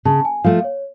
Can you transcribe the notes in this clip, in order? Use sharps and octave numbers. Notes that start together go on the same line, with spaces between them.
C#3 A5
G#5
F3 A3 F5
C#5